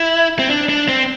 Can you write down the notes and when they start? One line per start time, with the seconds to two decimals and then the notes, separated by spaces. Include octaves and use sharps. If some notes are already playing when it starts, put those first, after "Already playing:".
Already playing: E4
0.39 C4
0.50 D4
0.69 D4
0.88 C4